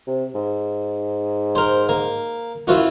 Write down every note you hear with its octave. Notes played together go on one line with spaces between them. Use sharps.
C3
G#2
A#4 C5
A#3
F#2 E3 F4 F#4